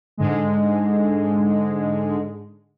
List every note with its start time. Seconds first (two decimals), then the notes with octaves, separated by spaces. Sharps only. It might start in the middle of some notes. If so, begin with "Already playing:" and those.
0.17 G#2 D3 G#3